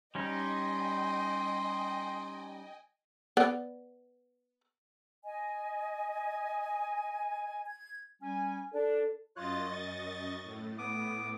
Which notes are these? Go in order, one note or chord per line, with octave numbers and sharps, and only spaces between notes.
G3 C#4 D#4 D#5 G5 G#5 C6
B3 D5
D#5 G#5
G#6
G3 C#4 G#5
D4 A4 D5
F#2 F4 C#5 D#5 F#6 A6
C#6
A2
B3 D6 D#6